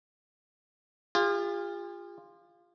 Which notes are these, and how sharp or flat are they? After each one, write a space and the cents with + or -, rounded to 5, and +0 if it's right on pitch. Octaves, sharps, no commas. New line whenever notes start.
F4 +0 G#4 -45